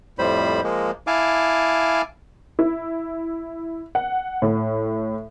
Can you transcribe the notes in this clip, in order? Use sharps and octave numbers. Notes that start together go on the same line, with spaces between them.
F2 A2 G3 C5 B5
F3 G#3 A#3
E4 F5 G#5 A5 D6
E4
F#5
A2